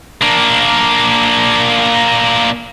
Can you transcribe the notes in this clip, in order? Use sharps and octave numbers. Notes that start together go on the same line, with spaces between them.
A#3 D4